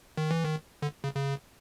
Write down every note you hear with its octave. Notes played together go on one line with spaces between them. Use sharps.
D#3
E3
D#3
D3
C#3
C#3